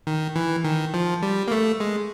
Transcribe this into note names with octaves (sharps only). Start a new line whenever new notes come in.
D#3
E3
D#3
F3
G3
A#3
A3
G#3